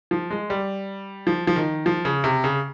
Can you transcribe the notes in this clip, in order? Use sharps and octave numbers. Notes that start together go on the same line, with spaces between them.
F3
G#3
G3
F3
F3
D#3
F3
C#3
C3
C#3